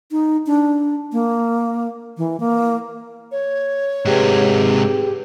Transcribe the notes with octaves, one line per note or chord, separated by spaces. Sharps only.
D#4
D4
A#3
E3
A#3
C#5
G#2 C3 G4 G#4 B4